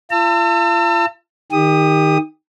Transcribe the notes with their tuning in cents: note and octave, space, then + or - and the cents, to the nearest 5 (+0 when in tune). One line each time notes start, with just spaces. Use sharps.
F4 -40 A5 +40 E6 +30
D#3 +0 G4 +25 D#6 +0